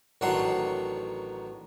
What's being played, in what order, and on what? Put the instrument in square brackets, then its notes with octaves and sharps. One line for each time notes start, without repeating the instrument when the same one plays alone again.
[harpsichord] A1 D#3 F#3 D4 F#5 C6